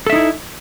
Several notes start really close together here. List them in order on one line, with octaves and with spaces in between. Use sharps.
A4 E5 D#4 E4